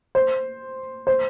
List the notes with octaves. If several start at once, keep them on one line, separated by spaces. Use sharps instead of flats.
C5
C5